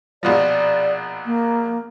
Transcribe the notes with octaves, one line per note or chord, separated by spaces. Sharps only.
A#1 B2 F3 D5
A#3